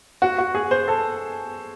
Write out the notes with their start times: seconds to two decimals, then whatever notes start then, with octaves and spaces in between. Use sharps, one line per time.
0.22 F#4
0.38 F#4
0.55 G#4
0.71 C5
0.88 A4